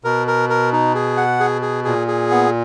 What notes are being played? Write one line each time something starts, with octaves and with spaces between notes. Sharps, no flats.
B2 A#4
A#4
A#4
D#4
G#4
F#5
G#4
G#4
A#2 G#4
G#4
B3